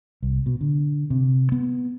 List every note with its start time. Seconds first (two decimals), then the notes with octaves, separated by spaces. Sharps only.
0.23 C2
0.46 B2
0.61 D3
1.10 C3
1.52 B3